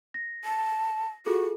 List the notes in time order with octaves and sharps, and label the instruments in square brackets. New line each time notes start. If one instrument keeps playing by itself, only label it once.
[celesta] A#6
[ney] A5
[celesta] F4 G#4 A4 [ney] F#4